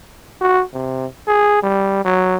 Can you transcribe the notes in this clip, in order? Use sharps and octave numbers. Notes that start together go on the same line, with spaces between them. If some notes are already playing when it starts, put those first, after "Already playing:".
F#4
C3
G#4
G3
F#3